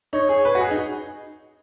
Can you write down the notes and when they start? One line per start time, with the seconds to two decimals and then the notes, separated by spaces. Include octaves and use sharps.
0.13 D#4 C#5
0.29 G#4
0.45 B4
0.55 F#4
0.61 G#4
0.71 D#4